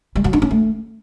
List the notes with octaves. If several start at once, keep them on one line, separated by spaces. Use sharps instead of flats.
G3
F#3
D4
C#4
A3